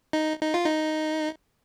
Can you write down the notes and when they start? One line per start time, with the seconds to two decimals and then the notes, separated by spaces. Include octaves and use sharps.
0.13 D#4
0.42 D#4
0.54 F4
0.66 D#4